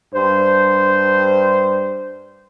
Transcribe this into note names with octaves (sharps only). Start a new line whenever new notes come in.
G2 D4 C5